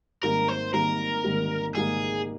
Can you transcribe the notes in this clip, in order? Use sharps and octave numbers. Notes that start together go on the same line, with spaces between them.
G#1 G#2 G3 A#3 A#4
C5
G#1 G#2 G3 A#3 A#4
G#1 G#2 G3 A#3
G#1 G#2 G3 A#3 G#4